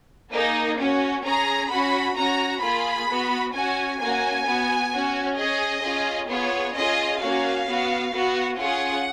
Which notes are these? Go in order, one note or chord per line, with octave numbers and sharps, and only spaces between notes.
A#3 D#4 G#4
C#4 F#4
C#4 G#4 A#5
C#4 F#4 B5
C#4 F#4 A#5
A#3 F4 G#4 B5
B3 F#4
C#4 F#4 G#5
A#3 C#4 F#4 G#5
B3 F#4
C#4 F#4
C#4 G#4 D#5
C#4 F4 G#4
B3 F4 G#4 C#5
C#4 F4 G#4 D#5
A#3 C#4 F#4 F5
B3 F#4
B3 F#4
C#4 F4 G#4 F#5